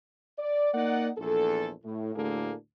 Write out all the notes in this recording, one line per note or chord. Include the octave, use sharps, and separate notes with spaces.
D5
A#3 D#4 D5 F#5
A#1 E2 A4
A2
D2 A2 D3 A#3 G#4 A4